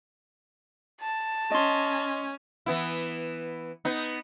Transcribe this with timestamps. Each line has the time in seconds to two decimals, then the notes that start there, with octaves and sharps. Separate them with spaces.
1.01 A5
1.52 C#4 D#5 C6
2.66 E3 B3 E4
3.85 B3 D#4